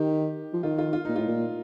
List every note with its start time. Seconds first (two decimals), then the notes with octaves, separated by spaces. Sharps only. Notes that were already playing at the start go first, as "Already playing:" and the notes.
Already playing: D#3 G4
0.53 F3
0.63 D#3 F4
0.78 F4
0.93 F4
1.05 A#2 D#4
1.16 A2 F4
1.28 A#2